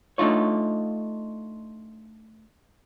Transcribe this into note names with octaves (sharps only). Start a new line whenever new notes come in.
A3 D4 D#4 F4 C#5